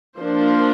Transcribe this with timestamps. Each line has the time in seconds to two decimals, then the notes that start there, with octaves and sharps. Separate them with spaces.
0.18 F3 A#3 D4 C5